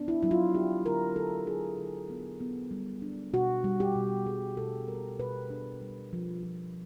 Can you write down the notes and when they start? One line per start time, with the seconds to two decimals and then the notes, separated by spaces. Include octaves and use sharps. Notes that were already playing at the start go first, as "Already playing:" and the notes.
Already playing: B3 D4
0.08 E4
0.23 F#3 E4
0.31 F4
0.55 D4 G4
0.85 D3 A#4
1.16 D3 A4
1.47 D4 G#4
1.78 D3
2.10 B3
2.41 B3
2.71 G3
3.02 D4
3.33 B2 F#4
3.64 G3
3.80 G4
3.95 B2
4.26 G3 G#4
4.57 B2 A4
4.88 G3 A#4
5.19 B2 B4
5.50 D4
5.82 G3
6.13 F3
6.43 F3